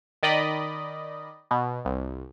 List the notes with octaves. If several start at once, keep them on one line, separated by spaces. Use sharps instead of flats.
D#3 D5 D#5 B5
B2
C2